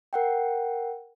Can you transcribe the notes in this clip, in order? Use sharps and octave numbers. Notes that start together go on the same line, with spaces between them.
A#4 F#5 G5